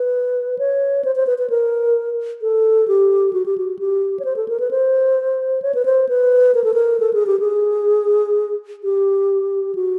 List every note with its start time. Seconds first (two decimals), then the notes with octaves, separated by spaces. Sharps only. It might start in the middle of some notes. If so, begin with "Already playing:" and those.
Already playing: B4
0.59 C#5
1.04 C5
1.16 C5
1.27 B4
1.38 B4
1.50 A#4
2.42 A4
2.88 G4
3.33 F#4
3.46 G4
3.58 F#4
3.79 G4
4.19 C#5
4.25 C5
4.36 A4
4.48 A#4
4.60 B4
4.71 C5
5.62 C#5
5.75 B4
5.85 C5
6.09 B4
6.54 A#4
6.64 A4
6.74 A#4
7.00 A4
7.13 G#4
7.27 G4
7.39 G#4
8.84 G4
9.75 F#4